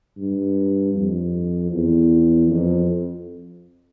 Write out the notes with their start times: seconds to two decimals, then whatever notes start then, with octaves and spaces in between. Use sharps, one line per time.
0.18 G2
0.95 F2
1.72 E2
2.49 F2